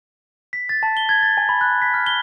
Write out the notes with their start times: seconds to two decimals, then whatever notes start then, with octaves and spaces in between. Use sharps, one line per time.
0.53 B6
0.69 A6
0.83 A5
0.97 G7
1.09 G#6
1.22 A6
1.37 G#5
1.49 B5
1.61 F#6
1.82 B6
1.94 F6
2.06 G7